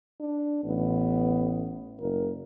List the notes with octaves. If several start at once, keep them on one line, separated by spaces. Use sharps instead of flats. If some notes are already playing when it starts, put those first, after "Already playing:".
D4
A1 B3
F#1 A#4